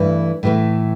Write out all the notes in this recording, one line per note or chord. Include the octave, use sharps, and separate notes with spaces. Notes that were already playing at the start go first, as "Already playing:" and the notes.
Already playing: G2 E3 A3
A2 E3 A3